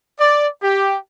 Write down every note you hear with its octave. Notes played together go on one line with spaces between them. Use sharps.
D5
G4